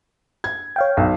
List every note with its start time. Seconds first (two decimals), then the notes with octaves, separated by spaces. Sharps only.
0.44 G#6
0.76 C#5 F5 G5
0.97 B1